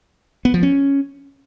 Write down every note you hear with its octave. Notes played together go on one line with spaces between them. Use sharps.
B3
F3
C#4